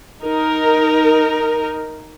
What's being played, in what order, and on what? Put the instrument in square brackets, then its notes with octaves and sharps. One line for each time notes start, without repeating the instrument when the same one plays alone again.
[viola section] D#4 A#4